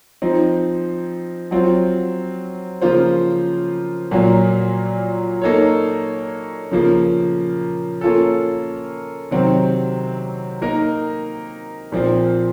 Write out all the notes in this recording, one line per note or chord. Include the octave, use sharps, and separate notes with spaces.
F3 C4 D#4
F#3 C4 F4
C#3 F3 A#3 F4 C5
A#2 F#3 A#3
A#3 D#4 A4 C#5
C#3 F3 A#3
A#3 C#4 F4 A4
C3 D#3 F#3 C4
A#3 D#4 A#4
A#2 F3 C4